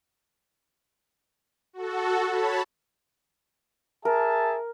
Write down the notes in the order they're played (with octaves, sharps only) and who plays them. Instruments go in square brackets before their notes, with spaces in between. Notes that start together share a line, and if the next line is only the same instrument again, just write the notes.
[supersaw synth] F#4 A4
C#5 A5 B5
[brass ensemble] G#4 E5 A5 [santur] A#4